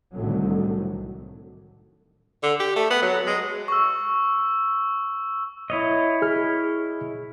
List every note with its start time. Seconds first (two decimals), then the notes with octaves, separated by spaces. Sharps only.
0.12 C2 A2 D3 D#3 F#3
2.43 D3
2.60 G4
2.76 A3
2.90 B3
3.02 F#3
3.26 G#3
3.68 C#6 E6
5.70 E4 C#5 D#5
6.22 G#4 F6